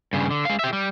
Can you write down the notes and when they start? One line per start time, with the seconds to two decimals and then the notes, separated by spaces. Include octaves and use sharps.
0.13 G2 C#3
0.31 D3
0.45 G#3 F5
0.59 G4 E5
0.73 G3